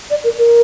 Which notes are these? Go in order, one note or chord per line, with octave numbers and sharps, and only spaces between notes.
D5
A#4
A#4